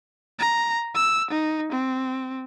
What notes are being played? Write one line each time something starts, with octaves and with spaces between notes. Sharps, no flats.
A#5
E6
D#4
C4